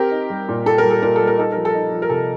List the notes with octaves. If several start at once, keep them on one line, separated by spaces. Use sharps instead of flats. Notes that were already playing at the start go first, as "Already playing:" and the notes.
Already playing: C4 G4 A#4
D#4
G3
A#2
A#2 A4
A#4
G3
A4
A#2 A#4
G3 A4
A#4
D#4 A4
F3 A#4
A4
D#4
F3
A#4
C3 A4